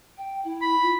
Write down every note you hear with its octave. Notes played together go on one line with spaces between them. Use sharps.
G5
E4
B5
F4